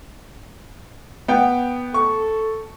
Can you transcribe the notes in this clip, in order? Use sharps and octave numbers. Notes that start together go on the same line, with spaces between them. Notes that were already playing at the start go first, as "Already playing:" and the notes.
B3 G5
A4 C#6